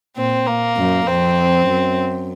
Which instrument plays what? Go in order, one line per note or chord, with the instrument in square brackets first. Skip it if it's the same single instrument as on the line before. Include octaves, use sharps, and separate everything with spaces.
[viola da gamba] A#2 [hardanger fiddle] C4
[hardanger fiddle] A#3
[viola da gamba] F#2
[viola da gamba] F2 [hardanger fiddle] C4
[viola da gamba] F#2